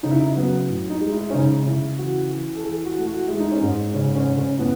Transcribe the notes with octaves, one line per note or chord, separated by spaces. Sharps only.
C#3 D#4
E4
D#4
F#3 B3
A2
D#4
G#3
E4
C#4
C#3 D#4
C#3 E4
E3 F#4
E3
A4
E3 G#4
F#4
A3
F#4
G#3 E4
D#4
C#4
G#2 D#4
C#3 C#4
C#4
C#3
C#4
A2 B3